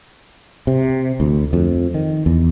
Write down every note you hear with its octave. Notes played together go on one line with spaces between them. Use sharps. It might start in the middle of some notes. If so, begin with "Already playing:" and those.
C3
D2
F2
D#3
E2